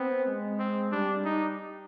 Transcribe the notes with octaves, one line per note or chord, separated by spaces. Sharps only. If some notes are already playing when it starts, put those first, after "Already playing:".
Already playing: B3 C4
G#3
C4
G3 D4
D#4